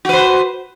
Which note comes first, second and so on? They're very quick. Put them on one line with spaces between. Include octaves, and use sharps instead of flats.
F#4 B4 C5